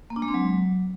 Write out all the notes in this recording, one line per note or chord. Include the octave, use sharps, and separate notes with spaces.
A#3
D4
G#3
C4
F#3